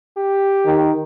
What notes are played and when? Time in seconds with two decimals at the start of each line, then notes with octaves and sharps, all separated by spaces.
0.17 G4
0.66 D#3